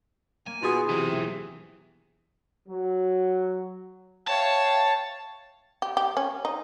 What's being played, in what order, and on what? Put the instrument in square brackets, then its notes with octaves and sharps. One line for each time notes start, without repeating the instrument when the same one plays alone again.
[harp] A#3 [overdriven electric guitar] G#5
[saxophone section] B2 [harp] F4 G#4
[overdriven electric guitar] B1 E3 [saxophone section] C3
[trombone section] F#3
[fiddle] C#5 [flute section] E5 F5 G5 [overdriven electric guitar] A5
[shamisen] G4
G4
C#4
D#4